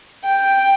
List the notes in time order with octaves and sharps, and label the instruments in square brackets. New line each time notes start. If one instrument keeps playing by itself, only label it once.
[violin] G5